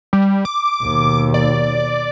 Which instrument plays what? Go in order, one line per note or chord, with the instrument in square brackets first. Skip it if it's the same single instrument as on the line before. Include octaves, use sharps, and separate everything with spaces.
[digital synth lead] G3
D6
[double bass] D#2 B2
[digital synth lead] D5